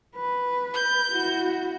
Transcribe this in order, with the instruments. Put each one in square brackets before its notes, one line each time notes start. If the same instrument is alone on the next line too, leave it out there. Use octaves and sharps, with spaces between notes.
[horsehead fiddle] B4
[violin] G6
[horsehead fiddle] E4 F#4